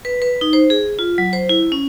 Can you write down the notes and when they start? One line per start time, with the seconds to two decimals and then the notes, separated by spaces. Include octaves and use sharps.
0.05 B4
0.22 B4
0.41 D#4
0.53 C5
0.70 G#4
0.99 F4
1.18 F#3
1.33 C5
1.49 E4
1.72 C#4